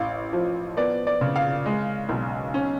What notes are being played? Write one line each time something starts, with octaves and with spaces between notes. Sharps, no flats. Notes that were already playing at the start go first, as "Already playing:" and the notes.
Already playing: A1 F5
F3
B3 D5
D5
C#3
F5
G#3
B1
C#4